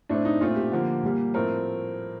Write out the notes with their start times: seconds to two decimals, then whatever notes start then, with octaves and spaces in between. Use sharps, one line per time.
0.09 A2 A3 C4 D4
0.25 D#4
0.41 A#2 A3 C4 F4
0.56 G4
0.72 D3 F3 A#3
1.03 A#2 G3 A#3
1.34 A2 F3 A3 C4 A#4